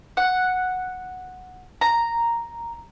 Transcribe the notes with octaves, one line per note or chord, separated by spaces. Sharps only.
F#5
A#5